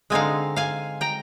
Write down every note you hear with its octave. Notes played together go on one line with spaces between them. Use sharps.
D3 G#3 C4 D#4 F5 G#5
F5 G#5
G5 A#5